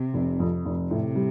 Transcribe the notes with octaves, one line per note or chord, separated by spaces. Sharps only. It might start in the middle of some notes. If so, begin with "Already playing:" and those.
Already playing: C3
F1
F2
F1
A2 C3
G3